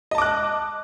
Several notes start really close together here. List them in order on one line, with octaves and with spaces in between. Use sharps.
D#5 A5 D6 F#6